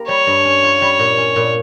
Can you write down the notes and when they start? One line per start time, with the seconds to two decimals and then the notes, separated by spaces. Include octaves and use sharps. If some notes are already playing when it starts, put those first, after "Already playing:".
Already playing: A#3 G4 A#4
0.08 G3 C#5
0.27 G2
0.45 C#4
0.64 F4
0.82 G3
0.99 A#2
1.18 C#4
1.36 A#2